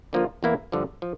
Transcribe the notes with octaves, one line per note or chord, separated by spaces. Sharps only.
D3 F3 A#3 F4
E2 E3 A#3 E4
G2 D3 F3
F3